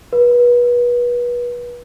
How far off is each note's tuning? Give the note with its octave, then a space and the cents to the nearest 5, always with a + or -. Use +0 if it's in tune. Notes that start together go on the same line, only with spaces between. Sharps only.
B4 -30